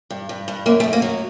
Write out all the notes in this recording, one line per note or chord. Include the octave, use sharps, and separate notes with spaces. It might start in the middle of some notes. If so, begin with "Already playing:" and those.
G2
G2
G2
F#2 A#3
A3
F#2
A#3
F#3